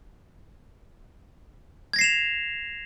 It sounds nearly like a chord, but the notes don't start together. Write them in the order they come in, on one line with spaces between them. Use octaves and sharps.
G#6 A#6 C7 E7 F7